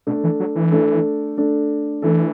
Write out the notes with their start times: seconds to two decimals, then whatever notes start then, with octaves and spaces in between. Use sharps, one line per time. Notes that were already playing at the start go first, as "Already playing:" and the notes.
0.07 B2 A3 D4 A4
0.24 E3
0.40 F#3
0.55 E3
0.72 A3 D4 A4
1.37 A3 D4 A4
2.02 E3 A3 D4 A4